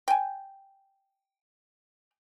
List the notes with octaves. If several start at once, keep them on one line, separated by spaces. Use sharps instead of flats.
G5 G#5